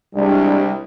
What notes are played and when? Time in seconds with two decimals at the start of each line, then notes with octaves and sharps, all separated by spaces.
0.15 C2 G3 G#3 D4